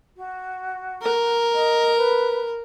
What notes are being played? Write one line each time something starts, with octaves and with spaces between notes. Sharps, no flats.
F#4
A#4
D#5
B4